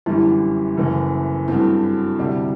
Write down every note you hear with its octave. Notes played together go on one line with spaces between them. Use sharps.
G1 F#2 E3 G3 E4
F#1 F#2 E3 A3
G2 F#3 A3 C4 E4
F#4
D2 C3 G3 D4